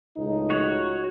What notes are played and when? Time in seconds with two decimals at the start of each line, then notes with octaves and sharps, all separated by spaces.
0.17 C#2 A2 D#4
0.50 F#4 C#5